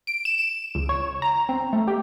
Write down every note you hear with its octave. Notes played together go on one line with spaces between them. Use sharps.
D7
E7
E7
C#2
C#5
A#5
C4
A3
G4